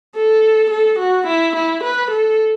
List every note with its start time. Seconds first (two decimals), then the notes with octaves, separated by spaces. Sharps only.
0.16 A4
0.71 A4
0.99 F#4
1.27 E4
1.56 E4
1.84 B4
2.11 A4